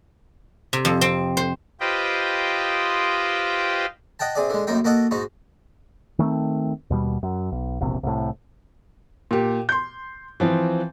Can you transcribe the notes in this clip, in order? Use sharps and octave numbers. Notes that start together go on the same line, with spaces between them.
C3
F2
C4
C5
F4 G4 B4 C5 D#5 G5
D#5 F#5 G5 A5
C3 G#4 D5
D3 G#3
A1 F#2 A#3 D#4 G5
A#3 F#4 A4 D#5 F#5
G#2 D#4 F#4
D#3 A3 A#3 C4
D#2 B2 G3
F#2
B1
E1 A#1 C3
C2 A2
A#2 G4
C6 G6
E3 F3 C4